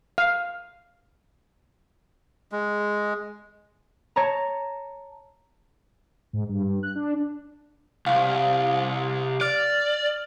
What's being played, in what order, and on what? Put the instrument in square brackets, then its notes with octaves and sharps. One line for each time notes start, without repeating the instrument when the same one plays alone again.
[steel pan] F5
[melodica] G#3
[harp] C#5 A5 A#5
[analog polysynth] G#2
G2
G2
F#6
D4
[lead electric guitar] C2 [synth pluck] F5
[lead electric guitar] D5 [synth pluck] F6